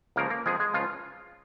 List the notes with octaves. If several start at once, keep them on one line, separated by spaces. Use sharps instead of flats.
C#2 C#3 F3 A#3 A#4
A#3 A#4
F2 F3 G#3 G#4
G#3 G#4
C#2 C#3 F3 F4